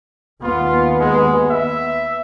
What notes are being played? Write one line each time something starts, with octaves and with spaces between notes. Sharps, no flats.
D#2 B3 F4
G#3
E5